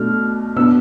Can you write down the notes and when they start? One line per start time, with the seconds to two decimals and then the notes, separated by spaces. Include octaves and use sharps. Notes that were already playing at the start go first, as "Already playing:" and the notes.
Already playing: B2 A3 D4 F6
0.56 B2 B3 D4 E6